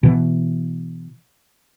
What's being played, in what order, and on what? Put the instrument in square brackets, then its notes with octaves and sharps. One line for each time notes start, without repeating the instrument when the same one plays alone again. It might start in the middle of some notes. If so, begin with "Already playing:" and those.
[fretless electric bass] B2 E3